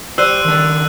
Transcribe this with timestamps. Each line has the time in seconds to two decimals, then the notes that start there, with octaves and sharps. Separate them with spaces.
0.18 G3 C5 E6 F#6 D#7
0.45 D#3 D4